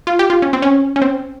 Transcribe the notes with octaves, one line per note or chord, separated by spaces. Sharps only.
F4
G4
F4
C#4
C4
C#4
C#4
C4